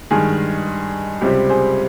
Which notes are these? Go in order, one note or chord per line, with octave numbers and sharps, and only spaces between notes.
G2 D#3 G#3 G#4
C#2 C3 G3 C4 G4
G#4 C5